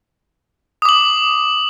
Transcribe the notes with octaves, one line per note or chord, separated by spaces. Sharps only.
D6 D#6 F#7